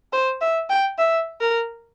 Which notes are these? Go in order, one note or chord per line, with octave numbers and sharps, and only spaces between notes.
C5
E5
G5
E5
A#4